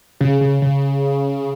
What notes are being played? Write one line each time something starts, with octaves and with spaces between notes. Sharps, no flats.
C#3
C#3
C#3